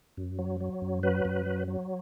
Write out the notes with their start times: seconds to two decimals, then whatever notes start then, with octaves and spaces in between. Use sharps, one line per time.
0.17 F#2
0.39 F#3
0.61 F#3
0.82 F#2
1.03 F#3 B4
1.25 F#2
1.46 F#3
1.68 F#3